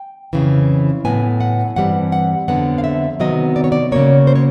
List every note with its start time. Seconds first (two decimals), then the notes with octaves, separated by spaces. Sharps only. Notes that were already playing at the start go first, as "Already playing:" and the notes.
Already playing: G5
0.33 F2 C#3 E3
1.05 A2 F#3 B3 G#5
1.41 F#5
1.76 G2 E3 G3 C4 F#5
2.12 F#5
2.48 F2 D3 F#3 B3 F#5
2.78 F5
2.84 E5
3.20 C3 D#3 F#3 B3 D#5
3.56 D5
3.64 C#5
3.72 D5
3.92 C#3 F#3 A#3 C#5
4.27 C5
4.35 C#5